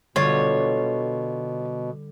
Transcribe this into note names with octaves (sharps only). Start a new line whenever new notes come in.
B2 D3 G3 F4 C#5